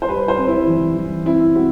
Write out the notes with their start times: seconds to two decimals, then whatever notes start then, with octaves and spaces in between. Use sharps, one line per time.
0.02 C5
0.08 G3 B4
0.28 C5
0.37 C4
0.48 E4
0.67 E3
0.96 E3
1.26 C4 E4
1.55 C4 F#4